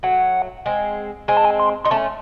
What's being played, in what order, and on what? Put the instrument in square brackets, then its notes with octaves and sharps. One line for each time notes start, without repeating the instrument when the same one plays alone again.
[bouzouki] F#3 A3 [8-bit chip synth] F#5
[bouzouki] G#3 C4
[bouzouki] G#3 C4 [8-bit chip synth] G#5
[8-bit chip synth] A5
G#5
C6
[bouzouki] D#4 [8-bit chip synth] C6
[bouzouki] A3 C#4 [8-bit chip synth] A5